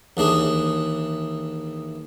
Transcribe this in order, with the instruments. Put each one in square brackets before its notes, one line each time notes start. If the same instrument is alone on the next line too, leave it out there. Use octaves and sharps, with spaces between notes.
[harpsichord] D#2 E3 D4 G#4